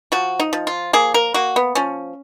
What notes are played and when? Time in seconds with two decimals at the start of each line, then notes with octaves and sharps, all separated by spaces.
0.12 F3 F#4
0.39 D#4
0.53 F3
0.67 F4
0.93 A#3 G#4
1.14 A#4
1.34 A#3 F#4
1.56 B3
1.75 F3 C#4